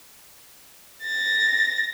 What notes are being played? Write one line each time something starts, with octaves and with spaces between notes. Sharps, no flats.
A6 A#6